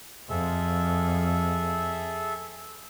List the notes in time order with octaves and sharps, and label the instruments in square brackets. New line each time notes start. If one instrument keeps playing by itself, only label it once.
[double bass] F2 [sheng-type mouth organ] G#4 A4 E5